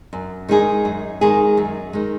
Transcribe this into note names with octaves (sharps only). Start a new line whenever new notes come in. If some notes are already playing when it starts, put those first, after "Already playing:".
F#2
D#3 G#3 D#4 G#4
F#2
D#3 G#3 D#4 G#4
F#2
D#3 G#3